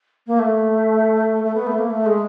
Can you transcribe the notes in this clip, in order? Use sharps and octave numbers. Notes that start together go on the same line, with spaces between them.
A#3
A3
A3
B3
A3
A#3
A3
G#3